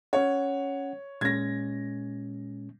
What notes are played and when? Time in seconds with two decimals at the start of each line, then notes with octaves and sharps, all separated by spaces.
0.13 C#4 C#5 F#5
1.21 A#2 G#3 C#4 G#6 A#6